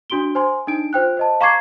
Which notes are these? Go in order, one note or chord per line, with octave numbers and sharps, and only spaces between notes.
D4 F#4 C6 D7 G7
C5 G#5 C6
D4 D#4 D7
F4 C5 G5 F#6
C5 D#5 A5
F5 A#5 C#6 D6 G#6 C7